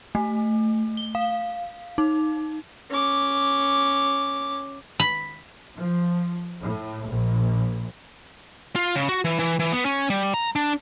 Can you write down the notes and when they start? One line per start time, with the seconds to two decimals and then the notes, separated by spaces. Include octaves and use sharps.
0.15 A3
0.97 G7
1.15 F5
1.98 D#4
2.90 C#4 D6
5.00 B5
5.74 F3
6.61 A2
7.06 A#1
8.76 F4
8.96 C#3
9.09 F#4
9.25 E3
9.39 E3
9.60 E3
9.72 B3
9.85 C#4
10.10 G3
10.34 A#5
10.56 D4